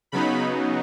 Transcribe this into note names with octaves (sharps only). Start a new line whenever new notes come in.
C#3 F#3 B3 D#4 B5